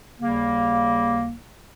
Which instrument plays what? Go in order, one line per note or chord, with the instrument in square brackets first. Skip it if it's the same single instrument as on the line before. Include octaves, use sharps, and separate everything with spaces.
[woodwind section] D#2 C#3 G3 A#3